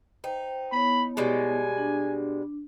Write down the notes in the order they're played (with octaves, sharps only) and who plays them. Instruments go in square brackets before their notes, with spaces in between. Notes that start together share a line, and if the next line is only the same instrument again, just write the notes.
[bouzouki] D#4 [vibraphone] B4 C5 G5
[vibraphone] B3 E4 C#5 [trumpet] B5
[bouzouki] B2 G3 G#3 [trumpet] G#5
[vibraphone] D4